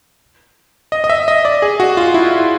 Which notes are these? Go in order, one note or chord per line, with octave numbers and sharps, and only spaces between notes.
D#5
D#5
E5
D#5
D5
G#4
F#4
F4
E4